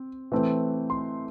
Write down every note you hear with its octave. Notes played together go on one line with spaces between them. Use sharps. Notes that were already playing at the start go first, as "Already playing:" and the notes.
Already playing: C4
E3 A3 C4
C6